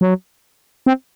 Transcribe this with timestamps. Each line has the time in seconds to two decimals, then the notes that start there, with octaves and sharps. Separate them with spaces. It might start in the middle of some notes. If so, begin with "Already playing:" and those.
0.01 F#3
0.86 C4